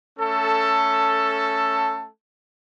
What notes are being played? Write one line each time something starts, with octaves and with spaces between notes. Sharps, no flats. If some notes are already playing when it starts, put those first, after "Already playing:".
A3 C#4 A4